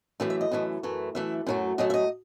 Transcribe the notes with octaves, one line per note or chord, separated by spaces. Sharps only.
F#2 E3 A3 E5
E5
D#5
F#2 E3 A3
F#2 E3 A3
F#2 E3 A3 E5
F#2 F#3 A3
F#2 F#3 A3 D#5
E5
D#5